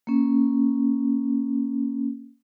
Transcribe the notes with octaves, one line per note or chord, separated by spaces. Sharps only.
A#3 C#4